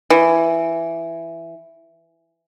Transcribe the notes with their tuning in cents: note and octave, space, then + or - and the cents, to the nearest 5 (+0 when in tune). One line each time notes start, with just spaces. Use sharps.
E3 +10